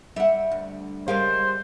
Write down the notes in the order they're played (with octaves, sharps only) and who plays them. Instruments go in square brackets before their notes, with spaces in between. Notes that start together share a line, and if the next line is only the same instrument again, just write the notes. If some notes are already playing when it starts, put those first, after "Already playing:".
[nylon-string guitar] G3 F#5 [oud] E5
[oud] D2
[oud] C#3 G#3 C#4 [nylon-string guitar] G3 A#4 F5 [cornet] C5